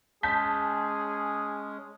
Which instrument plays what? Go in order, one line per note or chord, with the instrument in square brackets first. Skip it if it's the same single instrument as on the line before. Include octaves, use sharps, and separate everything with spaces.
[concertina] G#3 C#4 [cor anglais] G#4 [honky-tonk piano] A5 G6 B6